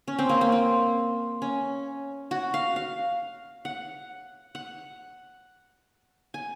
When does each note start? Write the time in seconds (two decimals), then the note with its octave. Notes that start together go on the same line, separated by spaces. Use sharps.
0.08 C#4
0.19 C4
0.29 A#3
0.41 C4
0.52 C4
1.42 C#4
2.31 F#4
2.54 F5
2.76 F5
3.65 F#5
4.55 F#5
6.34 G#5